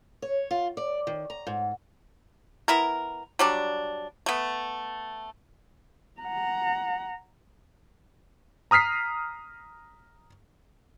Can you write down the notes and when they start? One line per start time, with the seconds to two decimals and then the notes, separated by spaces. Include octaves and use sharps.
0.22 C#5
0.51 F4
0.77 D5
1.07 D#3
1.30 A#5
1.47 G#2
2.68 B3 E4 A#4
3.39 F#3 G3 D4
4.26 A3 B3
6.21 F#5 A#5
8.71 A#5 D#6 F6 B6 C7